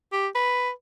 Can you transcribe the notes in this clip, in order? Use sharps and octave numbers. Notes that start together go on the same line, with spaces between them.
G4
B4